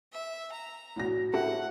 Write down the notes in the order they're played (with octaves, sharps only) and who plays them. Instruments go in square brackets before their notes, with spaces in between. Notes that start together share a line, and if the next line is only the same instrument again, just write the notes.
[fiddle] E5
A#5
[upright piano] A2 F#4 A#6
[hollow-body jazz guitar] E4 G4 A4 [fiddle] F#5